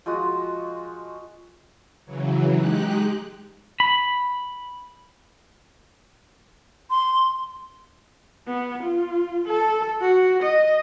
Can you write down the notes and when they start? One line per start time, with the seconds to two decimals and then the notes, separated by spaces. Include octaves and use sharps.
0.06 F3 G#3 F#4
2.05 C#3 E3 F#3
2.57 G#3 D#4 G4 F#6
3.80 B5
6.91 C6
8.47 B3
8.83 F4
9.46 A4
10.01 F#4
10.42 D#5